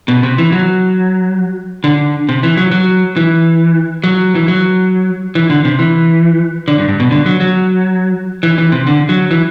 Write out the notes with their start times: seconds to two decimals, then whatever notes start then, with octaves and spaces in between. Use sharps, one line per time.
0.08 B2
0.23 C3
0.38 E3
0.52 F#3
1.84 D3
2.29 C3
2.43 E3
2.57 F#3
2.72 F#3
3.17 E3
4.04 F#3
4.35 E3
4.48 F#3
5.35 E3
5.50 D3
5.65 C3
5.79 E3
6.68 D3
6.78 G2
6.89 G2
7.00 B2
7.11 D3
7.26 F#3
7.40 F#3
8.43 E3
8.58 E3
8.72 C3
8.87 D3
9.09 F#3
9.31 E3